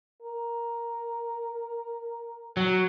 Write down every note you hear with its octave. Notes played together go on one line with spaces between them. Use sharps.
A#4
F#3